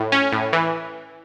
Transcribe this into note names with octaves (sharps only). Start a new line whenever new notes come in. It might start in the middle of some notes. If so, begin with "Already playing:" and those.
Already playing: A2
C#4
A2
E3